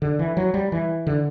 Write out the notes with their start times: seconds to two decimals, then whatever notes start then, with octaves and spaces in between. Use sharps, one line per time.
0.02 D3
0.19 E3
0.37 F#3
0.54 G3
0.72 E3
1.07 D3